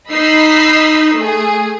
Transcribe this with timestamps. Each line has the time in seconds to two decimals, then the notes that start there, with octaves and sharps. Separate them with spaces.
0.11 D#4 D#5 B5 E6 B6 C7
1.15 A3 G#4